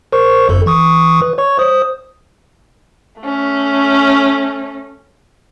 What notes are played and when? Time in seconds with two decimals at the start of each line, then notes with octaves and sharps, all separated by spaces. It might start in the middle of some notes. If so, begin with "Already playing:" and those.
0.12 A#4 C5 C#6
0.49 G1 F#2 A4
0.66 E3 C#6 D#6
1.22 B4
1.38 C#5 C#6
1.59 C5 D#6
3.21 A3 C#4